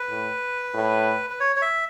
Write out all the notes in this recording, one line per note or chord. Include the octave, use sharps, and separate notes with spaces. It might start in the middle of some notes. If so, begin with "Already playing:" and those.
Already playing: B4
A2
A2
B4
C#5
C#5
E5